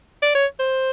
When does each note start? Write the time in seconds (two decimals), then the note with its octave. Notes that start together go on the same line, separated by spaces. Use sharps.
0.22 D5
0.35 C#5
0.59 C5